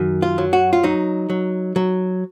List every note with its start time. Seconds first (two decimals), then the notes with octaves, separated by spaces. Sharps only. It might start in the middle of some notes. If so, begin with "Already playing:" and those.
Already playing: F#2 D#3
0.22 F4
0.38 F#3
0.53 F#4
0.73 F4
0.83 F#3 D#4
1.30 F#3
1.76 F#3